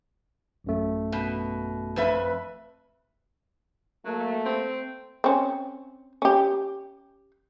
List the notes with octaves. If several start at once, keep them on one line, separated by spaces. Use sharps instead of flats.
A1 F#2 A3
B2
F2 B4 E5
F#3 A3 A#3
C4
C4 C#4
C#4 G4